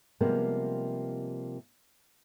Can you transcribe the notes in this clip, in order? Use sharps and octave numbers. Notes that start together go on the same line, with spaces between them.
C3 F3 G3 G#3 A#3 B3